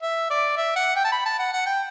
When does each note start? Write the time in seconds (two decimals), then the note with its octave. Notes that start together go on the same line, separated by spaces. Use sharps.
0.02 E5
0.30 D5
0.57 E5
0.76 F#5
0.96 G5
1.04 A5
1.12 B5
1.25 A5
1.39 F#5
1.53 F#5
1.66 G5